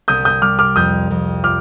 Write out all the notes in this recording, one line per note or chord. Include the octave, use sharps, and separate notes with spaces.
C2 D#6 G6
D#6 G6
G3 D6 F6
D6 F6
F2 D#6 G6
F2
F4 D6 F6